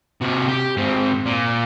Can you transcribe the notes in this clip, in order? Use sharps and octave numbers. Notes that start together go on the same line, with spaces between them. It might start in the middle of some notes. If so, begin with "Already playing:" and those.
C3 F#4
G4
G#2 C4
A#2